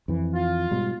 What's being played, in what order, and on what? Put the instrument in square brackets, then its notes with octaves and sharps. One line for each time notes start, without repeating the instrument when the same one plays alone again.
[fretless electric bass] F2 E3
[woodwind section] F4
[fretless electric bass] G#2 B2 G3